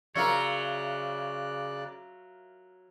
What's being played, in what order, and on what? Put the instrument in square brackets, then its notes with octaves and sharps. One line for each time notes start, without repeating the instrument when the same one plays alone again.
[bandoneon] C#3 D5 F#6 [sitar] F#3 F4 [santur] A#4 E5 [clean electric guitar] C#5